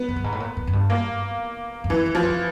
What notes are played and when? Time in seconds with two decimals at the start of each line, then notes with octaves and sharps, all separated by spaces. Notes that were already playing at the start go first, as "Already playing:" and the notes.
Already playing: B3
0.09 F#2
0.16 G2
0.24 G#2
0.32 A2
0.40 A#2
0.57 A2
0.67 F#2
0.73 G2
0.90 A#3
1.84 G2
1.90 F#2 E3
2.06 F2
2.15 F3
2.23 F#2